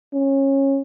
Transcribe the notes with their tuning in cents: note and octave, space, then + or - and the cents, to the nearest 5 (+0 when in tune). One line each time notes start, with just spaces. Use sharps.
C#4 -20